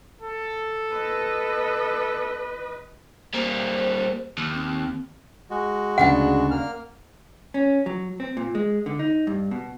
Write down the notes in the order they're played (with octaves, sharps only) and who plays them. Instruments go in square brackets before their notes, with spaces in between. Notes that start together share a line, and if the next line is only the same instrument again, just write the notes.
[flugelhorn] A4
[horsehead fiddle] B4 D#5
[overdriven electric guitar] G3 A#3 [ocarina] C5
[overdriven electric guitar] D#2
[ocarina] C4
[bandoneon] G#3 F#4
[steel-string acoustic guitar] D2 C#3 D4 [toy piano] F#5
[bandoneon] A#3 F6
[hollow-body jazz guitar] C#4
F#3
C4
A#2
G#3
D3
D#4
G2
B2